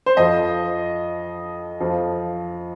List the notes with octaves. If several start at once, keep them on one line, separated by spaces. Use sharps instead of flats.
C5
F2 F3 D#5
F2 F3